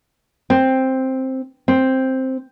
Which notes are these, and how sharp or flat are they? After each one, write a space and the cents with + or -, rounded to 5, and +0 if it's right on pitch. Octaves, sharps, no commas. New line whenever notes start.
C4 +5
C4 +5